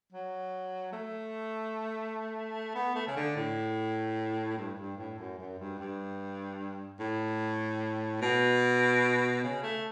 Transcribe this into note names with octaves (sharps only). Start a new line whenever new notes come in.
F#3
A3
B3
A3
C#3
D3
A2
G2
G2
A2
F#2
F#2
G2
G2
A2
B2
C#3
A3